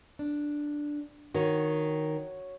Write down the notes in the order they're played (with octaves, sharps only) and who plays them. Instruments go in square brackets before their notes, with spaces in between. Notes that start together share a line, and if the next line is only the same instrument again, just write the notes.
[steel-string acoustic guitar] D4
[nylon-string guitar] D#3 [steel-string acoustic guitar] F#4 C#5 F#5